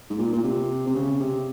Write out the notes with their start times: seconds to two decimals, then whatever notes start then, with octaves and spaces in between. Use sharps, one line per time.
0.10 G#2
0.18 A#2
0.33 A#2
0.44 C3
0.87 C3
0.95 C#3
1.20 C3